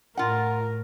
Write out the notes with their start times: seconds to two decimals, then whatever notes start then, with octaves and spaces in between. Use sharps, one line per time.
0.17 A2 F4 A#4 F#5